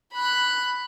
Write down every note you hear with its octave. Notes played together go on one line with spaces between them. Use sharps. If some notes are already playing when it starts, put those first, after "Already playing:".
B5 F#6